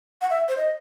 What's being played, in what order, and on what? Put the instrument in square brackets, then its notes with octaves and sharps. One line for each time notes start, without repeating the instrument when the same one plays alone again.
[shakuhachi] F#5
E5
C5
D#5